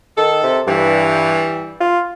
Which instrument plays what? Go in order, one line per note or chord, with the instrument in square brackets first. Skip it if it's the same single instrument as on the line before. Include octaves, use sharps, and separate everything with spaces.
[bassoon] D#3 [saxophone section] A4
[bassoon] C3
[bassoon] G2 [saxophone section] E3 G3
[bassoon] F4